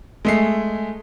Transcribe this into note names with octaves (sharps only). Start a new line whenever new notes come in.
G#3 A3 C7